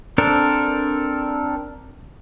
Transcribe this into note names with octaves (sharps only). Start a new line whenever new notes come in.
C4 D4 A4 A#4